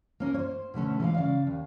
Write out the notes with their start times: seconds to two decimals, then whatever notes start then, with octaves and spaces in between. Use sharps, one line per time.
0.20 A#3 C#4 A#4
0.34 C5 C#5
0.74 B2 D3 A3 C#4
1.00 E3 G#3 A#4 F5
1.14 C#3 D5 F5
1.47 D#2